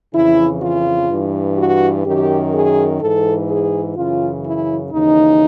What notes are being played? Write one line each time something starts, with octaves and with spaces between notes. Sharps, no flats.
F2 C#3 E3 E4
F4
G2 E3
F#4
F#2 D#3 G4
G#4
G#2 E3 A4
G#4
F#2 C#3 E3 F4
E4
D#2 C#3 E3 D#4